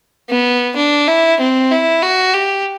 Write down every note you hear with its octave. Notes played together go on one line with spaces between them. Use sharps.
B3
D4
E4
C4
E4
F#4
G4